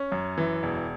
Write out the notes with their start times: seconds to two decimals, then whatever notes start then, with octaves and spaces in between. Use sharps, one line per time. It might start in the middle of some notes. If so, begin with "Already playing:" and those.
Already playing: C#4
0.12 F#2
0.38 E3
0.63 E1